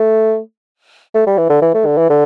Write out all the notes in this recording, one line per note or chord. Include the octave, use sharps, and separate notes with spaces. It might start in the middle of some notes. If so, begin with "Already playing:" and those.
Already playing: A3
A3
G3
E3
D3
E3
A3
D3
E3
D3